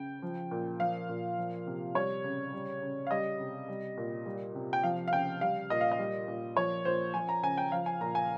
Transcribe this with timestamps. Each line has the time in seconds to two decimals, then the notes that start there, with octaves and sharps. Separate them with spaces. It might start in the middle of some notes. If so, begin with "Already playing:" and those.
Already playing: C#3 G5
0.22 F3
0.51 A#2
0.80 F3 F5
1.09 A#2
1.38 F3
1.67 C3
1.95 G3 C#5
2.24 C#3
2.53 G3
2.82 C#3
3.07 F5
3.11 G3 D#5
3.40 C3
3.69 G3
3.97 A#2
4.26 G3
4.55 C3
4.73 G5
4.83 F3 F5
5.08 F5
5.13 C#3 G5
5.41 G3 F5
5.70 A#2 D#5
5.81 F5
5.92 D#5
5.99 G3
6.28 A#2
6.57 F3 C#5
6.85 A#2 C5
7.14 F3 G#5
7.29 A#5
7.43 C#3 G#5
7.58 G5
7.72 F3 F5
7.86 G#5
8.01 A#2 A#5
8.15 G#5